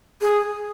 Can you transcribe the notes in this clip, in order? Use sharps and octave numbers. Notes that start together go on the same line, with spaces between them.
G#4